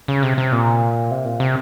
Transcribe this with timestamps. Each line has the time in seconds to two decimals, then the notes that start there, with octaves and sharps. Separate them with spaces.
0.08 C#3
0.23 C3
0.38 C3
0.52 A#2
1.11 C3
1.25 A#2
1.40 C3